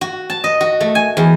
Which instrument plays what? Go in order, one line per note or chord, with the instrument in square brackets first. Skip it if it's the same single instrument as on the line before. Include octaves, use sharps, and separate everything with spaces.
[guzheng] F#4
A5
D#5
F#4
A3
G#5
E2